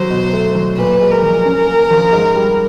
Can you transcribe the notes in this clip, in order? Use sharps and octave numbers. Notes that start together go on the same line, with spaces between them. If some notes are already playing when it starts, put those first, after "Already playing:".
Already playing: F#3 C5
B2
A3
F#3
A#2 B4
G#3
A#4
F3
C#4
A#3
F3
G#2
G3